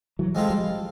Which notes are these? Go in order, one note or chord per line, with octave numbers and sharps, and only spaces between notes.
E3 F#3
G#3 C4 F4 A4
F3 G3